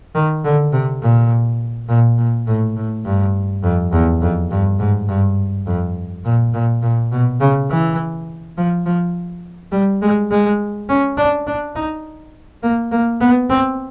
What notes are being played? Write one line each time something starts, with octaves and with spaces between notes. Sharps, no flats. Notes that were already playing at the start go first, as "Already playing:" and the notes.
D#3
D3
C3
A#2
A#2
A#2
A2
A2
G2
F2
E2
F2
G2
G#2
G2
F2
A#2
A#2
A#2
B2
C#3
E3
F3
F3
G3
G#3
G#3
C#4
D4
D4
D#4
A#3
A#3
B3
C4